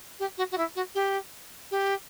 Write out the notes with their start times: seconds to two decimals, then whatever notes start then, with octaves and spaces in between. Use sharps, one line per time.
0.19 G4
0.38 F#4
0.51 F#4
0.57 E4
0.76 F#4
0.95 G4
1.71 G4